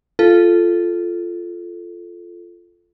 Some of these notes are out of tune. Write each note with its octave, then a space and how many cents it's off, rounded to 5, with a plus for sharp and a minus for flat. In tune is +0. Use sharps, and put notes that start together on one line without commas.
F4 -10 A4 -10